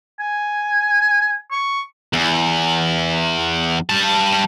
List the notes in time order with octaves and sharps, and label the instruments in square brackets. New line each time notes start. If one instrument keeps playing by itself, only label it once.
[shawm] G#5
C#6
[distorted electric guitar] E2
G3 A5